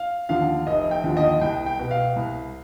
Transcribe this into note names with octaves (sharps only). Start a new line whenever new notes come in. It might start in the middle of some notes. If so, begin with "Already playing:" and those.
Already playing: F5
D#2 D3 F3 F5
F1 D#5
G5
D#2 D3 F3
D#5
C2 G5
G5
B2
F5
C2